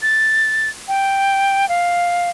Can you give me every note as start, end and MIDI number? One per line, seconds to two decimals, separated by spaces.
0.02 0.69 93
0.88 1.68 79
1.69 2.30 77